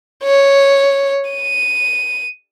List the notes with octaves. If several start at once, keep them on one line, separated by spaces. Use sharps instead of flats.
C#5
D#7